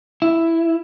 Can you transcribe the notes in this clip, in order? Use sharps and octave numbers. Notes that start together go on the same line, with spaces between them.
E4